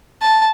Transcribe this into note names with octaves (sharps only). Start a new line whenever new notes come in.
A5